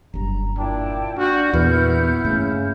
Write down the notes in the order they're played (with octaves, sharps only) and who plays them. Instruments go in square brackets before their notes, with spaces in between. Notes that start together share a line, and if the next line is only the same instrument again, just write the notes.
[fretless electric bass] F#1 G2 [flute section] A#5
[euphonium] A#2 [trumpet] D4 [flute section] E4 G5 A5
[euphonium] D4 [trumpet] F#4 [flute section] F#5 F6 G6
[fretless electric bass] E2 A#2 [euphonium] B3 [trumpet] E4
[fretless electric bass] G2 A3 A#3 [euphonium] C#3